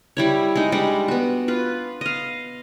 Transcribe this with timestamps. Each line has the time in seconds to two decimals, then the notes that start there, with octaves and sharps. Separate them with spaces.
0.17 G3 E4 C#5
0.55 G#3 D#4
0.72 G3 G#3 D4
1.08 B3 F#4
1.48 F4 B4
2.01 D#5 F5